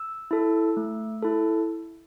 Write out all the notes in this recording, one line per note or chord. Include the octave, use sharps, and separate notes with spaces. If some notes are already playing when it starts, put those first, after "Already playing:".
Already playing: E6
E4 A4
A3
E4 A4